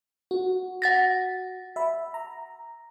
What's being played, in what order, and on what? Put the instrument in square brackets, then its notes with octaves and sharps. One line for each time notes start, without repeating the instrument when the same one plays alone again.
[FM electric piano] F#4
[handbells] F#5 A6 A#6
[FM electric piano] E5 B5
A#5